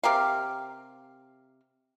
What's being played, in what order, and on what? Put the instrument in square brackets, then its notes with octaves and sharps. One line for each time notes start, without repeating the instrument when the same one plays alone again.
[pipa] C3 G4 A#4 F5